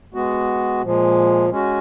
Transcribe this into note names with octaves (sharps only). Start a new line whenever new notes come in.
G#3 B3 F#4
A#2 F3 G#3
G#3 C#4 F#4